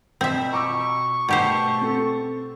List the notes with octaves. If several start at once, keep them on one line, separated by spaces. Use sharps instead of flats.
B2 C4 E5
A#5 C#6 D6 E6
B2 A3 G4 C5
C4 A4